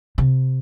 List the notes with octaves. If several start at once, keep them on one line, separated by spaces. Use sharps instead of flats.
C3